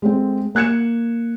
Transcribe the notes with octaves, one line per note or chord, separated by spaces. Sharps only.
G#3 A3 C4
A#3 F#6 G#6 C#7 E7